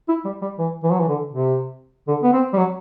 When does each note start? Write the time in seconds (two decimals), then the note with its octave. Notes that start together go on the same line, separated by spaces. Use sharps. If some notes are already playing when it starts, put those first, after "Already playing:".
0.09 E4
0.25 G3
0.42 G3
0.59 E3
0.83 E3
0.92 F#3
1.00 E3
1.08 D3
1.33 C3
2.08 D3
2.23 B3
2.33 C4
2.53 G3
2.58 F#3